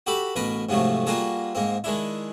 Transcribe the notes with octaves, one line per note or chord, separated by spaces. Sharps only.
F#4 G4 A4 B5 D6
A1 B2 A#4 B4
G#2 C3 F3 F#3 A3
G3 A#3 F4 F#4 G#4 A4
G#2 A#3 C4
D#3 G#3 D4 E4